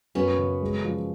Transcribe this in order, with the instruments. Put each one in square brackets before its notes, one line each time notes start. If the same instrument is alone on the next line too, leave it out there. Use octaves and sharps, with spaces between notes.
[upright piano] F#2 [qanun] B3 C#4
[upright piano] C#3
G#3
F3